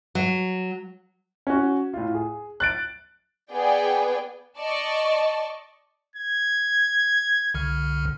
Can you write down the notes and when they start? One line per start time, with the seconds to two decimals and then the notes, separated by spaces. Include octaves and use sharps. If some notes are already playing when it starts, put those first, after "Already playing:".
0.15 F#3
1.47 C#4 F#4
1.94 A2 F4
2.14 G#4
2.60 F#6 A6 D7
3.51 B3 G#4 D5 G5
4.59 D5 D#5 A5 C#6
6.16 G#6
7.54 C2 D3 F6